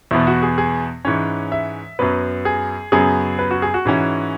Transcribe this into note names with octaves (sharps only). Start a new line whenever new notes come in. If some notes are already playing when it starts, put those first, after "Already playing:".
E2 B2 B3 E4
F#4
G#4
G#4
G#2 E3 C#4 C#5
E5
F#2 F#3 B3 B4
G#4
F#2 C#3 F#3 B3 G#4
B4
F#4
G#4
F#4
G#2 E3 C#4